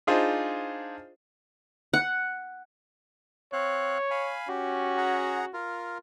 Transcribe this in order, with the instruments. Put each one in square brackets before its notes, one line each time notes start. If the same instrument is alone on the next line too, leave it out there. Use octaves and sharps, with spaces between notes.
[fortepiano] D4 D#4 F4 G#4 C5
[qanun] F#5
[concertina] C4 F5 F#6 [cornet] C#5
[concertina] F5 G#5 B5
[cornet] C#4 [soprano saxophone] F#4 [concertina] G4
[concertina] G#4 F#5 A#5
F4 A#4